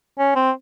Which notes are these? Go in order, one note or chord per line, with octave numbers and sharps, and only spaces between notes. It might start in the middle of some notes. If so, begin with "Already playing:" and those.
C#4
C4